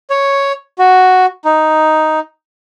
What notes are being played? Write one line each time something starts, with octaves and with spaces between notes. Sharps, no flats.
C#5
F#4
D#4